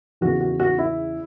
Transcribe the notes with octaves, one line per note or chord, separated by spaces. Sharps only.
E2 C#3 E3 F#4
F#4
F#4
E4